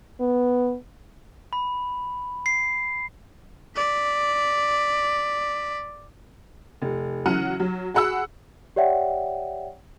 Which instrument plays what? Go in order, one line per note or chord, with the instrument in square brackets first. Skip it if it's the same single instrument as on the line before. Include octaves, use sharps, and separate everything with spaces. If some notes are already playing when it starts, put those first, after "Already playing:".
[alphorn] B3
[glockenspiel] B5
C7
[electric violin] D5 B6
[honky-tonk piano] F1
C#3 E3 F#3 F#5 F6 D#7
F#3
F#4 G#4 F#5 B5 E6
[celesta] G4 C#5 D5 E5 F#5 G5